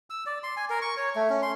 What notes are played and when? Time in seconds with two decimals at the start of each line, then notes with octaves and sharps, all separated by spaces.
0.10 E6
0.26 D5
0.43 C6
0.57 G#5
0.70 A#4
0.82 C#6
0.97 C#5
1.16 A3
1.30 C#4
1.42 C6